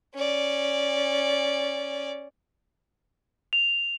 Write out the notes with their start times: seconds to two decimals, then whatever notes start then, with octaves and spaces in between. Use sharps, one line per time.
0.14 C#4 D5
3.53 F7